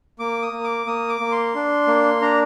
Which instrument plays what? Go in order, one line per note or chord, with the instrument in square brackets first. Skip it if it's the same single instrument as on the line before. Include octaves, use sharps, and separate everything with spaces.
[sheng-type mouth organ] A#3 D6
D#6
A#3
D6
A#3 D#6
D6
A#3
C6
D4
A#3
D4 A#5